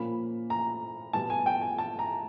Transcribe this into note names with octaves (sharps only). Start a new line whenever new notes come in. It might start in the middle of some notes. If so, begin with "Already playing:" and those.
Already playing: A#2 F3 A#3 C#4 B5
A#5
B2 G3 B3 A5
G#5
G5
G#5
A5
A#5